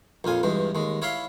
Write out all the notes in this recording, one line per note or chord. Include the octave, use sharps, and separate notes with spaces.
A#1 F2 F4 G#5
E2 G2 G#3
D#2 G#3
E4 C#5 F5 B5 C6